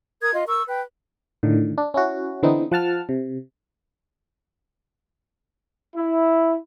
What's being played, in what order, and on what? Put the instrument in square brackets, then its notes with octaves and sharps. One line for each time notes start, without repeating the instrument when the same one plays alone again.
[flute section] A#4 D#6 G#6
F4 D#5
A#4 C#6 E6
B4 G5
[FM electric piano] A2 D3 D#3
D4
C#4 E4 F#4
D3 E3 B3 C4 D#4
F3 F#5 A5 F6
C3
[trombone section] E4